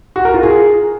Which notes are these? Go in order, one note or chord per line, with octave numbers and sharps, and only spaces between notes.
F#4
A#4
F4
G#4